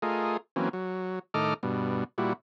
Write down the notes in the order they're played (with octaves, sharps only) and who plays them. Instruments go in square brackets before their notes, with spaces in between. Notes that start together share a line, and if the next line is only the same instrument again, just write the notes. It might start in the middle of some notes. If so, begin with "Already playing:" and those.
[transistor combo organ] A3 F4 G#4 A#4 D#5
E3 F#3 A#3 C4 C#4
F#3
A2 D#3 A4 D#5 D6 F6
G2 B2
A#2 G3 E4 F#4